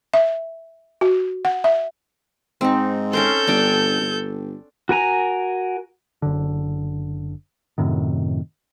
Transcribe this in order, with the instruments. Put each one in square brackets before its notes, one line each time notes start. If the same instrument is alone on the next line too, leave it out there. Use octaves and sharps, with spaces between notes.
[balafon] E5
F#4
F#5
E5
[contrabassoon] G#2 [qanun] C4 D#4
[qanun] C#4 A#4 C5 [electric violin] A4 G6
[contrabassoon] G1 [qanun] D4 D5 G5
[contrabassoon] G1
[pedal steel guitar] F#4 A#4 G#5 A#5
[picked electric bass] F#1 D3
F#2 A2 C3 D#3